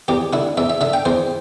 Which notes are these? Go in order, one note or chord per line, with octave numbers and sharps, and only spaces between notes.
E2 G4
D3 E4
E2 E5
E5
D3 E5
G5
E2 C5